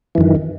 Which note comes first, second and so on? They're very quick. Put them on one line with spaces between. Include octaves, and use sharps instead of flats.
E3 F#2 D#3